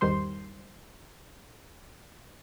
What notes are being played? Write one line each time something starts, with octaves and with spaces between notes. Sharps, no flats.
G#1 E2 D#3 G3 C5 C6